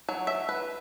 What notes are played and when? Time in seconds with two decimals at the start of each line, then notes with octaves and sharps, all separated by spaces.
0.08 F#3
0.27 E5
0.49 B4